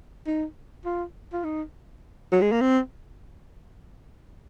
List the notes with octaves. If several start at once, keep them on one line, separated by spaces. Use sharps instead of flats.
D#4
F4
F4
D#4
F#3
G#3
A#3
C4